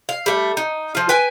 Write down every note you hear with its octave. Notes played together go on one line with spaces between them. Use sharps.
F5
G3 A3
D#4
F3 F4
B4 G5 G#5